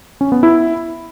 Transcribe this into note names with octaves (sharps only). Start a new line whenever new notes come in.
C#4
B3
E4